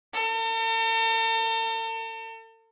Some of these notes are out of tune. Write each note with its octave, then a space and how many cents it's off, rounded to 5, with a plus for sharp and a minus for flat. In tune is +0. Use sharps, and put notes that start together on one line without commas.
A4 +45